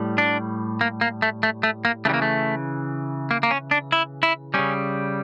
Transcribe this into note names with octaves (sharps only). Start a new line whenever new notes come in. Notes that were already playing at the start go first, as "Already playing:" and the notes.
Already playing: A2 G3
D4
A#3
A#3
A3
A3
A3
A#3
C#3 E3 G3 A3
A#3
A3
A#3
A#3
C#4
D4
E4
E4
C#3 G3 C#4